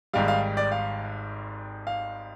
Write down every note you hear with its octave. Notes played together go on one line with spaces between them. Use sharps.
G#1 G#2 G3 F5
F5
D5
F5
F5